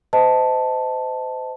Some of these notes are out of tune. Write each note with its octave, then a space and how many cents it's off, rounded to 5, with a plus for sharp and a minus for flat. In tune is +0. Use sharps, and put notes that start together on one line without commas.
C5 -35 D#5 +15 A5 +0